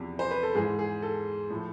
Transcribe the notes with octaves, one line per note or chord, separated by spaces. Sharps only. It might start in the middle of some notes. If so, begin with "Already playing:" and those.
Already playing: E2 C3 F3
C5
B4
A4
G#2 E3 G#4
G#4
A4
A2 F3